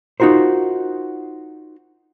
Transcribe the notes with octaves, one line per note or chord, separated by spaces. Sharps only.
D#4 F4 F#4 A#4 C5